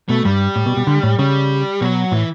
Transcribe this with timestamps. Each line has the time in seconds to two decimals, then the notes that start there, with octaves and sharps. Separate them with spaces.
0.09 B2 A3
0.25 G2 G3
0.56 A2
0.66 B2
0.77 B2
0.87 D3
1.03 A2
1.18 C#3 G3
1.81 B2 F#3
2.12 A2 E3